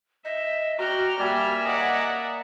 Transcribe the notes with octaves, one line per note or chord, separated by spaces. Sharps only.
D#5 E5
F#4 D5 G5 A#5 F6
G3 A#3 D5 E5 G#5
D5 D#5 F#5 A#5